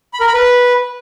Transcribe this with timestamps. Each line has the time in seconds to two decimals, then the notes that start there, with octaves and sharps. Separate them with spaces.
0.14 B5
0.20 A#4
0.27 B5
0.34 B4